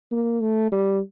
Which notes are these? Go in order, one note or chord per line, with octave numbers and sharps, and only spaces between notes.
A#3
A3
G3